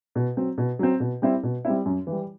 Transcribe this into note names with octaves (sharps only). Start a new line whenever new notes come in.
B2
F#3 C4
B2
F#3 C4
B2
G3 C4 E4
B2
G3 C4 E4
F#2
E3
G3